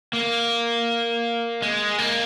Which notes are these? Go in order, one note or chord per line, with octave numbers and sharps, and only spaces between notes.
A#3
G#3
A#3